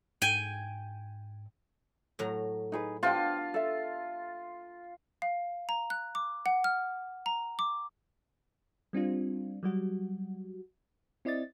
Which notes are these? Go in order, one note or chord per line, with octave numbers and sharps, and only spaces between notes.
G#2 G5 G#5
A2 F#3 A#5
D#4 G#4 B4
B3 D4 F4 G4 C5 F5 G5
A4 E5
F5
A#5
F#6
D6
F#5
F6
A#5
D6
G3 C4 D4 F4
F#3 G3 F#4
C4 E4 D5 D#5 A6